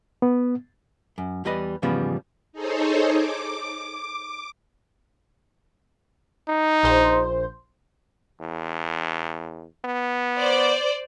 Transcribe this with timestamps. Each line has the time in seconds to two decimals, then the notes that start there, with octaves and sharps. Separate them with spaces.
0.22 B3
1.18 F#2
1.45 E2 G3 B4 D#5 B5
1.82 E2 G#2 C#3 F3 G3 B3
2.53 D#4 G#4 A4 C5 C#5
3.10 D6
6.48 D#4
6.83 A#1 C5
8.41 E2
9.85 B3
10.38 C5 D5